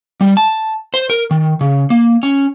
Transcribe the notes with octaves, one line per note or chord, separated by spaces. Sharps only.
G3
A5
C5
A#4
D#3
C#3
A#3
C#4